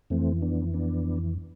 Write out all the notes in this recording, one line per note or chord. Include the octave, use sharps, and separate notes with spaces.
F2 E3 A3 C4
B3 D4
B3 D4